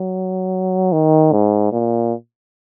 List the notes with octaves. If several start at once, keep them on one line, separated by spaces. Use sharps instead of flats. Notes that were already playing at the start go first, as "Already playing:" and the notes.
Already playing: F#3
D#3
G#2
A#2